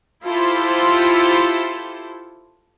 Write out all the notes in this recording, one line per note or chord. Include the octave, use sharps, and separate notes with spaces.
E4 F4 G4 A4 C5